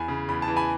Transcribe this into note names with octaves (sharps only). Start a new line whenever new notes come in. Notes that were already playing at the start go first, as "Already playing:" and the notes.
Already playing: E2 G#5 B5
C#3
E2 B5
A5
E3
G#5 B5